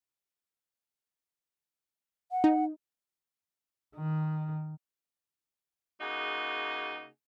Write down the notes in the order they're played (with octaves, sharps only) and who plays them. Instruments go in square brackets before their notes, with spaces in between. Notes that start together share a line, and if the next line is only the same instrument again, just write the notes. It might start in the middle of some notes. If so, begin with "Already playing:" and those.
[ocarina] F#5
[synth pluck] D#4
[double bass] D#3
[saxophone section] C#3 A#3 D#4 F#4 G#4